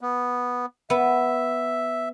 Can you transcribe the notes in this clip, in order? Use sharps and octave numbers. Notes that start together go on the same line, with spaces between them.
B3
B3 E5